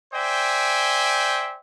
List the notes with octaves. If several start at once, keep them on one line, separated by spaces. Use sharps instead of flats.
C5 D5 E5 G5 G#5